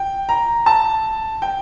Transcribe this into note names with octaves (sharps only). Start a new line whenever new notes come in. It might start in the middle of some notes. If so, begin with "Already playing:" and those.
Already playing: G5
A#5
A5
G5